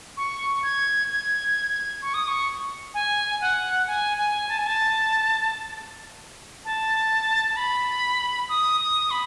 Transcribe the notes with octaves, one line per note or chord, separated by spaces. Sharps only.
C#6
G#6
G#6
C#6
D#6
C#6
G#5
F#5
G#5
G#5
A5
G#5
A5
A5
A5
B5
D#6
D#6
B5